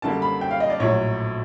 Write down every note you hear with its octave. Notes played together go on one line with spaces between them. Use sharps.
F#2 D3 G3 A#3 A5
B5
G5
F5
D#5
D5
A#1 A2 F#3 C#5